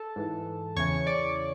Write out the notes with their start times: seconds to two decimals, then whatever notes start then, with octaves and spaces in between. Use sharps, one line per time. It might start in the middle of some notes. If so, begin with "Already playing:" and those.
Already playing: A4 A5
0.16 G#2 E3
0.76 E2 C#3 E3 C#5 C#6
1.07 D5 D6